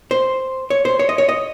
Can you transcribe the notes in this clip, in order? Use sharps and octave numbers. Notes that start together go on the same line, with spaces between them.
C5
C#5
C5
C#5
D#5
C#5
D#5